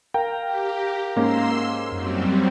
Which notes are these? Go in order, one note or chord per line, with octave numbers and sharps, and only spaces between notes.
A#4 F5 G5 A#5
G4
G#2 A#3 C#4 C6 E6
F#2 F#3 G3 C4